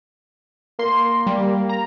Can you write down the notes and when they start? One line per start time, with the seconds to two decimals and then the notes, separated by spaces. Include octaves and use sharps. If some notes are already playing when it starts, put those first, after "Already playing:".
0.79 A#3 C6
1.27 G3
1.69 A#5